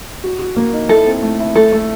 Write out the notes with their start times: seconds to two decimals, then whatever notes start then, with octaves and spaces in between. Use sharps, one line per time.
0.24 F#4
0.39 F#4
0.57 A#3
0.73 D#4
0.89 E4 A4
1.06 C4
1.23 A3
1.40 E4
1.56 A3 A4
1.72 A3